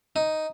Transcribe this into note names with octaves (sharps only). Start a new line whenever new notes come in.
D#4